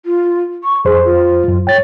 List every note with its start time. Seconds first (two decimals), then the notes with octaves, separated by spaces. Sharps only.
0.05 F4
0.64 C#6
0.85 F2 G#4 C5
1.05 F4
1.48 F#2
1.67 C#5 G5 A6